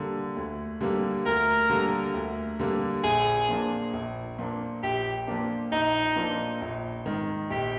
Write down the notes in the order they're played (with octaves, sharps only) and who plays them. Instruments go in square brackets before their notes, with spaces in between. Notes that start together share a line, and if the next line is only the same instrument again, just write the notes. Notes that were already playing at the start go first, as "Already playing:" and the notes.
Already playing: [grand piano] D3 G3 A#3
D2
D3 G3 A#3
[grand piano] D2 [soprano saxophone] A#4
[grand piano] D3 G3 A#3
D2
D3 G3 A#3
[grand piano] A#1 [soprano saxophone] G#4
[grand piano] A#2 F3 A#3 D4
A#1
A#2 F3 A#3 D4
[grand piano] A#1 [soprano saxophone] G4
[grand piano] A#2 F3 A#3 D4
[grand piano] A#1 [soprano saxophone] D#4
[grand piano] A#2 F3 A#3 D4
A#1
G#2 D#3
[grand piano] A#1 [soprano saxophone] G4